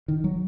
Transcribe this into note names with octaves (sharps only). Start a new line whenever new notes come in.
D#3
F#3